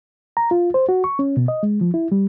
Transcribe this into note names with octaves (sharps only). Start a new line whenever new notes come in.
A#5
F4
C5
F#4
C#6
C#4
B2
D#5
G#3
F3
E4
G3